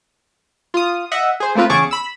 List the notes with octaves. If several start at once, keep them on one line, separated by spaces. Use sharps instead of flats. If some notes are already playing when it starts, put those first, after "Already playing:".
F4 D#6
D#5 E5 F#5
G#4 C5
A3 A#3 C4 F4 B4
E2 C#3 G#4 A5 C#6 D6
B5 E6